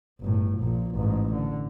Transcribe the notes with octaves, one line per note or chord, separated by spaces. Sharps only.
G1 A2
A#1 A#2
A1 G#2
D3